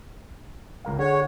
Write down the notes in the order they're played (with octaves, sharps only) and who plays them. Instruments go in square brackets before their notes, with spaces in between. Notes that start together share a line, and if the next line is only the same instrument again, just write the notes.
[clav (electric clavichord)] C#2 A#4 F5
[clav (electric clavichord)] D3 [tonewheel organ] G#4 F#5 [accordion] C#5